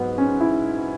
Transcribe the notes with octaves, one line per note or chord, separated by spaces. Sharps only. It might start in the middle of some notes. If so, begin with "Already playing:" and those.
Already playing: G#2 F#3 B3
C#4
E4